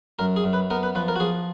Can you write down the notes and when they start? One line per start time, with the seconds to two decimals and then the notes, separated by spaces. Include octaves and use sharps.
0.19 F#2 A#4
0.36 G#4
0.44 F#2
0.53 B4
0.70 B3 A#4
0.83 B4
0.95 F3 B4
1.08 A#4
1.16 F#4
1.20 F3 G#4